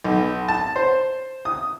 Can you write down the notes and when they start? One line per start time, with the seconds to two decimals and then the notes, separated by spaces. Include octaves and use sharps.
0.04 B1
0.48 A5
0.76 C5
1.45 D#6